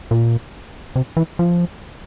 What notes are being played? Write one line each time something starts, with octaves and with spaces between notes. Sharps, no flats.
A#2
C3
E3
F3